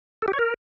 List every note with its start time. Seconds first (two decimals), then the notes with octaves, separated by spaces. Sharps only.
0.22 A4
0.28 G4
0.33 C#5
0.39 A#4